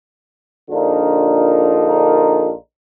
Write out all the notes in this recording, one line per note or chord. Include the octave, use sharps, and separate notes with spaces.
A#1 D3 D4 D#4 F4 A#4